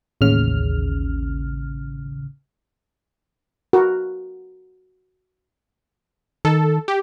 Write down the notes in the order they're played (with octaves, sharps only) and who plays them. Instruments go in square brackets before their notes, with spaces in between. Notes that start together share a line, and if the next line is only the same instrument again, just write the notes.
[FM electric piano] A1 D#2 C#3 F6
[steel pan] F#4 A#4
[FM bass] D#3 [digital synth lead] A4
[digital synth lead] G4